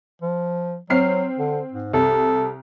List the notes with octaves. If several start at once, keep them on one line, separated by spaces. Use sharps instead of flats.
F3
F#3 C4 F6 C7
D3
G#2
C2 A4